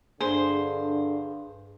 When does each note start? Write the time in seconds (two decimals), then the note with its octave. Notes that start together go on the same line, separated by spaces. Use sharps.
0.20 G2 D3 G#4 C5